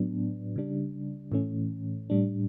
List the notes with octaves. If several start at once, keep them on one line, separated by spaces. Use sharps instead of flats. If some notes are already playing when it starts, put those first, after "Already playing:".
Already playing: A2 F#3 B3 D4
C#3 G3 D4
A2 E3 A3 C#4
A2 G3 D4